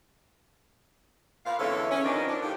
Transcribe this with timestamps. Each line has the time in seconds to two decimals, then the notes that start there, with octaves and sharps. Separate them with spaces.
1.46 A#2 B4 C5 F5
1.59 E2 D3 G#3 A4 C#5 E5
1.91 C#4
2.04 D#3 F3 B3 C4 D4 D#4
2.28 D4
2.42 A2 C#3 F3 G4